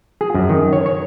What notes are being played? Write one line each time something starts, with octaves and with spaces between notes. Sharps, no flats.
G#4
F#2
D#3
C#5
C#5